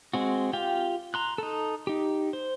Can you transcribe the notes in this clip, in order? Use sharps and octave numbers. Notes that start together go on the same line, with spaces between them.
G#3 C4 F#4
F4 G4 F5 G5
A#5 C6 F#6
D#4 A4
D#4 G4
C5